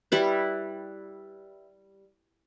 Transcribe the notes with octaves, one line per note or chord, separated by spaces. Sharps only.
G3 E4 B4